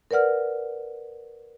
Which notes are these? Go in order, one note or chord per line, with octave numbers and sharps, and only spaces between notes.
A#4 B4 D5 F#5 F6